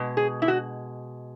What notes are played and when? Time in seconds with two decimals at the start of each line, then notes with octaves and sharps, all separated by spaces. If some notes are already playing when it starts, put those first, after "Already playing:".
Already playing: B2 G#3
0.17 G#4
0.42 E4
0.48 F#4